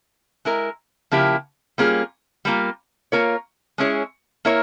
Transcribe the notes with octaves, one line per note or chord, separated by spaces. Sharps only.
G#3 E4 A#4
C#3 F3 A#3 E4 G4
G3 A#3 C#4 F4 G#4
G3 A#3 F4
A#3 F4 A#4 C#5
G#3 C#4 E4 G#4 C#5
A#3 E4 A#4 C#5